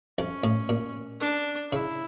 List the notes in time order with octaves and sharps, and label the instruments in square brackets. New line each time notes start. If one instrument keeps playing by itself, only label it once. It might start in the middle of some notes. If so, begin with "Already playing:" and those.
[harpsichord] F2 [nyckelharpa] C#4
[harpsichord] A2
A#2
[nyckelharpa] D4
[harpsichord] C#3 [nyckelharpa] E4